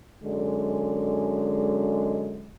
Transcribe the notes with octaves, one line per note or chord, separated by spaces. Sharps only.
F#2 D3 G#3